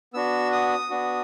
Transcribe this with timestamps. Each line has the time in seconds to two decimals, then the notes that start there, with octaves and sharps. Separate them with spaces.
0.14 B3 D4 F#4 E6
0.52 D#6
0.90 B3 D4 F#4